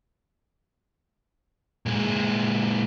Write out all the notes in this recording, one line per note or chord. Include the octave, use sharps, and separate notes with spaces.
A#2 G#3